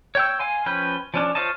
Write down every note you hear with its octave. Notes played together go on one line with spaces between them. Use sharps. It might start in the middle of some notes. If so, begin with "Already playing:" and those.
C#5 G5 E6
F5 G#5 C6
F3 C#4 B4 G5
F3 C#4 D4
F4 C5 C#5 D#5 A5